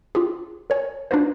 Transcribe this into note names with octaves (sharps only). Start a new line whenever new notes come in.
F4 G4 G#4
A#4 C#5 G#5
D4 D#4 F4 F#4 B4 C5